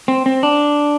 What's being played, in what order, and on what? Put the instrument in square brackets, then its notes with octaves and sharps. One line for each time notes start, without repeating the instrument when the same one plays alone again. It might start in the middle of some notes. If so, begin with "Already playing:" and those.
[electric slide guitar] C4
C4
D4